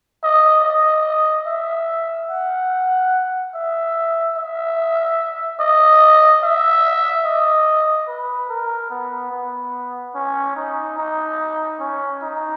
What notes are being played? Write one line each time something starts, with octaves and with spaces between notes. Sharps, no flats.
D#5
D#5
E5
F#5
E5
E5
D#5
E5
D#5
B4
A#4
B3
B3
C#4
D#4
D#4
C#4
D#4